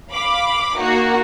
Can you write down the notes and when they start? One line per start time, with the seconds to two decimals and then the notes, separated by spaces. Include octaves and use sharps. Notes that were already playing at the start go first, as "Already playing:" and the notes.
0.11 F5 B5 D6
0.77 A#3 D#4 F#4